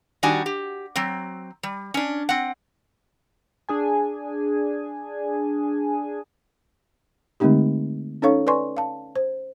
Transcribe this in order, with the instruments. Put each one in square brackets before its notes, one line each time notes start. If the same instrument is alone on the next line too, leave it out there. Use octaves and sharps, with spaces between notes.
[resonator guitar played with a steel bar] D#3 G3 D4 F#4 G#5
G4
F#3 C4
G3
C#4 D4
C4 F#5
[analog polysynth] D4 G#4 G#5
[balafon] D3 G#3 A3 C4 D#4 G4
C#4 D#4 A4 C#5 F5 C#6
B4 D5 G#5 C6 C#6
F5 A5
C5